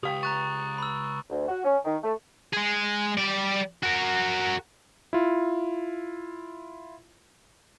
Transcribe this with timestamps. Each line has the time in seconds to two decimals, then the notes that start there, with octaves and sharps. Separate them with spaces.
0.03 C#2 G4 F5 G5 D#6
0.23 A#5 C#6 F#6 A6
0.78 B5 E6
1.30 D2
1.48 F#4
1.64 C#4
1.85 D#3
2.04 A3
2.53 G#3 G#4
3.18 G3 D5
3.83 F#4 A#4
5.13 E4 F4